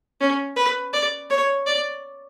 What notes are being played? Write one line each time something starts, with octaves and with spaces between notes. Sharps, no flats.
C#4
B4
D5
C#5
D5